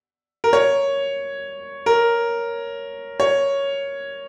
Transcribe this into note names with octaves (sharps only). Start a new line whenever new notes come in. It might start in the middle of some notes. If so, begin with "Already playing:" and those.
A#4
C#5
A#4
C#5